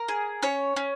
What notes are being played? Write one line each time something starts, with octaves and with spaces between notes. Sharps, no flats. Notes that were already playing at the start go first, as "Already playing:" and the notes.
Already playing: A#4
G#4
C#4 C#5
C#4